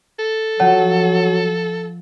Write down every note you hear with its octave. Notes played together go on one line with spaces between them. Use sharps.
A4
F3 F#3 C#5 F#5 A5